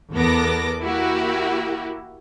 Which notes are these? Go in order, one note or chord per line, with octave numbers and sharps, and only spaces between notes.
E2 B3 A4 A#4 D6 A#6
A#3 E4 F#4 G4